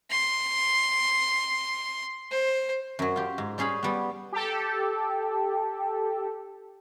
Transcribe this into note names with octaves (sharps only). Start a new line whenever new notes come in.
C6
C5
F#2 F#3
F4 G4
G#2
G3 C#4 G#4 F5 B5
G3 B3
G4 A4